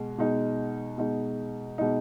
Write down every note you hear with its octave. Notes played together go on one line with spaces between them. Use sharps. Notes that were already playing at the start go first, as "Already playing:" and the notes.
Already playing: B2 G#3
B2 G#3 D#4
B2 G#3 D#4
B2 G#3 D#4